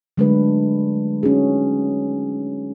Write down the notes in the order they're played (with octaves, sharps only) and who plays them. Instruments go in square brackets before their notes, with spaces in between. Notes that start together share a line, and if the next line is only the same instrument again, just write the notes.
[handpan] D3 F#3 G#3 A3 D4 B4
C#4 D#4 F#4 G#4